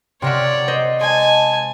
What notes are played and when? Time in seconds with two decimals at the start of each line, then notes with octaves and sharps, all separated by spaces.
0.22 C3 F4 A#4 C#5 D5 E5 F#5
0.68 C5 D#5
1.01 G#3 G#5 A5